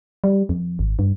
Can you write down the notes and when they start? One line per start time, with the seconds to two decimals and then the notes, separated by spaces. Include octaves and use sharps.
0.24 G3
0.49 F2
0.79 G#1
0.99 G2